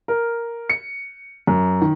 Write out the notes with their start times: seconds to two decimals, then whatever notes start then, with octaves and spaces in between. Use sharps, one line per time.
0.08 A#4
0.70 C#7
1.47 F#2
1.81 D#3